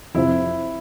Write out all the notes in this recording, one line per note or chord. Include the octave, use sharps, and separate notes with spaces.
F2 C3 F3 E4